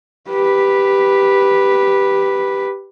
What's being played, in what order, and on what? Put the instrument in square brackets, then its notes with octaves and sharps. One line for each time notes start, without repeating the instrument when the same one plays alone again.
[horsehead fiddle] G4 B4